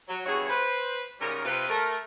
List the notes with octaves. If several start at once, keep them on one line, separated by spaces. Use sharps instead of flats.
F#3
E2 G2 E4 F#4 G#4 C#5
B4 C5
G#2 C#3 G3 C#4 A#4
C3 F4 B4
A3 A#4